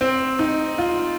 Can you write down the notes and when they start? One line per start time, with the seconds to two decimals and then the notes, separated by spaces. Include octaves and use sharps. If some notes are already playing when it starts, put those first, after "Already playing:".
0.01 C4
0.39 D#4
0.78 F4